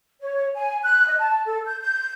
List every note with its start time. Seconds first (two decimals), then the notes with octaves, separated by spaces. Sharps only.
0.21 C#5
0.54 G#5
0.82 F#6
1.06 D#5
1.18 A5
1.45 A4
1.66 G6
1.80 G6